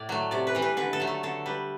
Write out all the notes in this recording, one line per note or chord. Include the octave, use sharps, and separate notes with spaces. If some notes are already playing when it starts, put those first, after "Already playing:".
Already playing: A2 D5
F#3 A3
C3 D5
B4
E3 G3
B4
D3 B4
A4
F#3 A3
A4
D3 A4
G3 B4